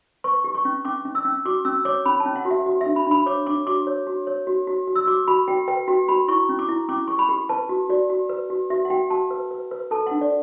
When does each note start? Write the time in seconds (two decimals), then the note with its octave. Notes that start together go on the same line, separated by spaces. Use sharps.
0.24 B4 C#6
0.44 G4
0.54 C#6
0.65 C#4
0.85 C#4 D6
1.05 C#4
1.15 E6
1.25 C#4
1.45 F#4 D6
1.65 C#4 E6
1.85 C#5 D6
2.06 C#4 B5
2.20 A5
2.25 C#4
2.36 F#5
2.45 F#4
2.51 E5
2.66 F#4
2.81 E5
2.86 D4
2.96 B5
3.07 D4 B5
3.26 C#5 D6
3.46 D4 D6
3.67 F#4 D6
3.87 C#5
4.07 F#4
4.27 C#5
4.47 F#4
4.67 F#4
4.87 F#4
4.96 E6
5.07 F#4 D6
5.28 F#4 B5
5.48 F#4 G5
5.68 B4 G5
5.88 F#4 G5
6.08 F#4 B5
6.28 E4 C#6
6.49 C#4
6.59 D6
6.69 E4
6.89 C#4 D6
7.08 G4 C#6
7.19 B5
7.29 G4
7.49 B4 A5
7.69 F#4
7.89 F#4 D5
8.10 F#4
8.29 B4
8.50 F#4
8.70 F#4 E5
8.85 F#5
8.90 F#4 G5
9.10 F#4 A5
9.31 B4
9.51 B4
9.71 B4
9.91 A4 A5
10.07 D4 F#5
10.21 D5